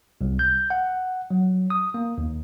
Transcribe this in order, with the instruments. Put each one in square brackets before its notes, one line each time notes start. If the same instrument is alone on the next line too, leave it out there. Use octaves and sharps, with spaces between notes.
[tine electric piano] C2
G6
F#5
F#3
D#6
A#3
D#2